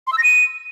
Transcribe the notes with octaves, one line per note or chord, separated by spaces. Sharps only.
C6
E6
A#6
D#7